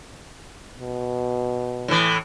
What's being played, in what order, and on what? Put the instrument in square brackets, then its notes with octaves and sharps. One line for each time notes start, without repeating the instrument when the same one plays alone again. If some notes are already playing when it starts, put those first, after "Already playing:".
[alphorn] B2
[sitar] A2 E3